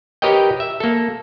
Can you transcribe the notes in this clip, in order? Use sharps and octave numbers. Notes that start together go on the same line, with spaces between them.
G4 A#4 B4 C#5 D#5 G5
E5
A#3 A4